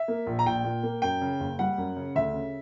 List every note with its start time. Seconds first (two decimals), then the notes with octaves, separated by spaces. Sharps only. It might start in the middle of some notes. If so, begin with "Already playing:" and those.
Already playing: E5
0.08 A#3
0.27 A#1
0.39 A#5
0.46 A#1 G5
0.65 A#2
0.83 A#3
1.02 F#2 G5
1.21 C#3
1.40 F#1
1.59 G3 F#5
1.78 F#2
1.97 C#3
2.15 D2 E5
2.34 C#3